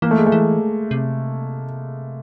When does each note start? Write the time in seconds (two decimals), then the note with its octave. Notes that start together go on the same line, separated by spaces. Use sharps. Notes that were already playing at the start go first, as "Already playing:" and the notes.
0.02 E3 A#3
0.11 A3
0.18 G#3
0.26 A3
0.32 E3
0.91 C3